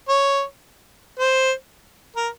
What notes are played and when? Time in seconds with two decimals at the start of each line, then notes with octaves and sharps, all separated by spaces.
0.09 C#5
1.19 C5
2.17 A#4